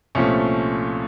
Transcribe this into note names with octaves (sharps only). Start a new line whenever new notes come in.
C2 A#2 F3 A3 C#4